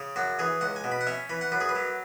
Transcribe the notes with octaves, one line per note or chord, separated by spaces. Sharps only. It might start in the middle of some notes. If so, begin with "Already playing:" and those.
Already playing: C#3
F#2 F#4
E3 G#4
C#2 F#5
G#5
B2
B5
F#5
C#4 E5
E3 B5
F#5
F#2 B4
G#4
B4
F#3